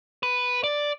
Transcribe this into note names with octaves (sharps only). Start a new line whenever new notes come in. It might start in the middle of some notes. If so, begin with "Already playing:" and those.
B4
D5